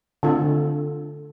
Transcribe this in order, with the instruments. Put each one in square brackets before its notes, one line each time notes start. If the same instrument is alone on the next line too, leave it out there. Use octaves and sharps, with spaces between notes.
[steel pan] D3 C4 F4 A4